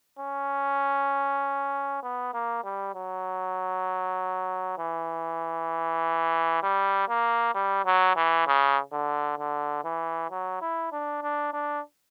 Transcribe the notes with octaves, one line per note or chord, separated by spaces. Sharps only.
C#4
B3
A#3
G3
F#3
E3
G3
A#3
G3
F#3
E3
C#3
D3
D3
E3
F#3
E4
D4
D4
D4